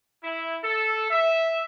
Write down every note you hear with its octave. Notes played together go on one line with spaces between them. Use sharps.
E4
A4
E5